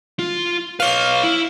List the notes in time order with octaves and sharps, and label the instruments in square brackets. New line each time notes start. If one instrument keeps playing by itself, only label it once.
[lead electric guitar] F4
[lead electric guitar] B4 C#5 [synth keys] F5
[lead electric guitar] E4